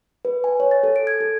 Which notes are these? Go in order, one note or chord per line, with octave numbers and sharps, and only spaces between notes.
B4
G#5
C#5
A6
A4
D7
G#6
A4